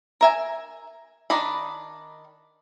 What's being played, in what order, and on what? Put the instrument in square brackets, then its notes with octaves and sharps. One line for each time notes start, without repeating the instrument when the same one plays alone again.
[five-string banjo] A#4 E5 G#5
D#3 D4 D#5 B5